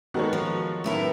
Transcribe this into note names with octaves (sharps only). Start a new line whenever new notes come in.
D#3 G#3 B3 F#4 A4 C#5
F3
F#2 A2 D#3 B3 E4 A#4